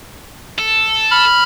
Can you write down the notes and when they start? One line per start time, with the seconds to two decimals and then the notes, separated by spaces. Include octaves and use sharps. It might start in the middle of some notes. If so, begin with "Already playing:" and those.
0.59 A4
1.11 B5 F6